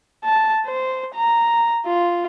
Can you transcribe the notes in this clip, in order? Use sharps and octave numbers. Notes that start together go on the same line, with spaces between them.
A5
C5
A#5
F4